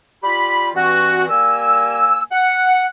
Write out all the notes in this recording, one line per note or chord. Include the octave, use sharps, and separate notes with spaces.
G3 F4 G4 B5
G2 E3 C4 F#4
G3 A#3 A#4 G#5 E6
F#5